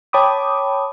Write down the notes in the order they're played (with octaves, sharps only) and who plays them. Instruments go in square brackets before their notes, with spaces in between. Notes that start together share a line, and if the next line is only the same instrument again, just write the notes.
[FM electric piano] C#5 G5 A5 B5 D6 D#6